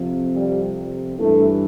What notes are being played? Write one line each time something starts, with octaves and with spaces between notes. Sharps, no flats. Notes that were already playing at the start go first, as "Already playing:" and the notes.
Already playing: F2 C3 F3
G3
G2 E3 A3